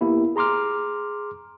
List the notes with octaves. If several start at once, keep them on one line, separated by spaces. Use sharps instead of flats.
A#3 B3 E4 G4
G#4 A#5 C6 D6 F6